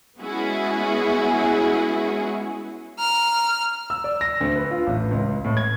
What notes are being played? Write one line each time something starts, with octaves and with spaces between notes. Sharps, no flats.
G#3 B3 C#4 E4 F#4 G#4
A#5 F6
E6
D5
A#6
D2
B4
F4
A1
C#2
A2
G#6